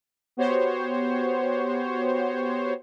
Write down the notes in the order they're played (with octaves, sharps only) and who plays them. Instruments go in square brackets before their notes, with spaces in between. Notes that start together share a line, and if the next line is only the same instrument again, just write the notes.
[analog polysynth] B3 F#4 G4 C5 C#5